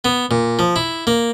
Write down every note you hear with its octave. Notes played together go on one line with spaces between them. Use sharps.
B3
A#2
F3
E4
A#3